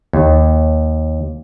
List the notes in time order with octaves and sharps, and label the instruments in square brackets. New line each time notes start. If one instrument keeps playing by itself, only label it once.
[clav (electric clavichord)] D#2